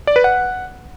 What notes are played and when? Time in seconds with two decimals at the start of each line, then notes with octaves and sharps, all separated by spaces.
0.07 D5
0.16 B4
0.24 F#5